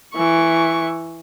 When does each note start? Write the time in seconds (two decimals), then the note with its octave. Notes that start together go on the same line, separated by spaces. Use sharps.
0.14 E3 C#6